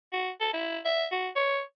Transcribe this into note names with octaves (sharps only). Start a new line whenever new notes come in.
F#4
A4
E4
E5
F#4
C#5